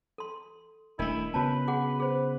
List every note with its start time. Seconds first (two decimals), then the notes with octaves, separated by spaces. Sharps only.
0.18 A4 C6
0.99 D#1 A3 D4 E4 A#4 D#5
1.34 C#3 B3 F#4 B4 C#5 A5
1.68 F#4 G#4 F#5
2.00 G#4 B4 C5